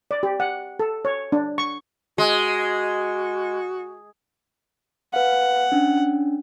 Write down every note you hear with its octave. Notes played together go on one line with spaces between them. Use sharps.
D5
G4
F#5
A4
C#5
D4
C#6
G#3 F#4
B4 F5 F#5
C#4 D4